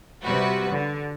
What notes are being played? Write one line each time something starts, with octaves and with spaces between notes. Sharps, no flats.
C3 G3 F#4 B4
D3